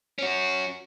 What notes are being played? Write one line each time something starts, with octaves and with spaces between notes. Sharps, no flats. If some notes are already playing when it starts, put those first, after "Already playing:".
C#4 F#4